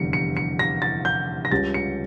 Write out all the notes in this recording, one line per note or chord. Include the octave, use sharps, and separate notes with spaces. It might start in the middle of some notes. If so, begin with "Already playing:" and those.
Already playing: F1 E2 D3 G3 C#7
C#7
C#7
A#6
A6
G6
A#6
C#2 C#3 G3 A6
C#7